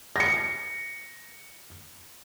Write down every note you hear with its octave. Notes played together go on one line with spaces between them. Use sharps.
A#6 C#7